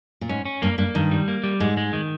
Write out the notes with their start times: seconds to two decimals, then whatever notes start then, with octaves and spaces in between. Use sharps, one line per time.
0.21 A#2
0.29 G#2 C#4
0.45 C#4
0.62 G2 A#3
0.78 G2 A#3
0.95 G2 D#3
1.11 G3
1.28 A#3
1.44 G3
1.60 G#2 G#3
1.77 G#3
1.93 D#3